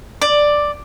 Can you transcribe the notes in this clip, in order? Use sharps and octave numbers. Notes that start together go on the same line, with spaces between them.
D5